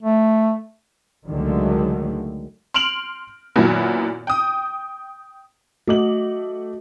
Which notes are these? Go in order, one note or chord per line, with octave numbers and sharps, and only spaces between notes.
A3
C#2 D3 D#3 F#3 G#3 A3
C6 F6 D7 F7 F#7
F#2 A#2 D#3 F#3 B3 E4
G5 D#6
A3 F#4 D#5 D6 F#7